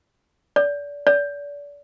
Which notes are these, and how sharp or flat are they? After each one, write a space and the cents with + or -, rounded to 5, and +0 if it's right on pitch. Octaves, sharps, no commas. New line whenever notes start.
D5 -30
D5 -35